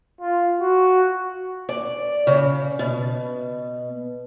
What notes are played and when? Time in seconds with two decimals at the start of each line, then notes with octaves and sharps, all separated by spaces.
0.21 F4
0.61 F#4
1.69 D5
2.27 C#3
2.79 B2